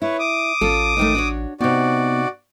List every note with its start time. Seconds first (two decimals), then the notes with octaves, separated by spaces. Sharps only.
0.02 E4 B4 C#5
0.19 D6 D#6
0.61 A1 C#4 F4 A4
0.97 D#2 D#3 A3
1.15 D4 F#4 C#5
1.61 C3 B3 D#4 F#4 D5